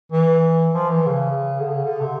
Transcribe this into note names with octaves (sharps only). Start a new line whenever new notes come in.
E3
F3
E3
C#3
D3
C#3
D3
C3